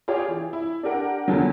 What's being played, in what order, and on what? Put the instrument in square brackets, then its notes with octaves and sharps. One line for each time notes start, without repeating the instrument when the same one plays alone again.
[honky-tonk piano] F4 G4 G#4 C#5 D5
E3
E4
D4 G4 A#4 F#5
E2 D3 F3 F#3